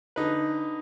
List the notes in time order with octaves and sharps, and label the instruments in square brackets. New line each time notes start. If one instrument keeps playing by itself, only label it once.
[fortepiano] D3 D#4 B4